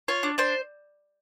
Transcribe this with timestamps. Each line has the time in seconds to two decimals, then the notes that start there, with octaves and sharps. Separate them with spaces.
0.08 F4 C#5
0.23 D4
0.38 D4 C5